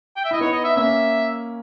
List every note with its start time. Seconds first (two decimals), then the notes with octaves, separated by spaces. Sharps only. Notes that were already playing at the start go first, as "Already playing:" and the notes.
0.17 G5
0.25 E5
0.31 E4 D#5
0.41 B3 D#4 C#5
0.53 D#5
0.64 E5
0.76 A#3 C#4 E5